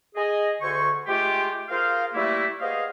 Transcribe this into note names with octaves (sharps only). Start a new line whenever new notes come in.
G#4 D#5
D2 D3 F#4 C5 G#5 C#6
G#3 A3 F4 G4
F4 G#4 A#4 C5 F5
G3 A3 A#3 E4
B3 G#4 C5 D#5 F5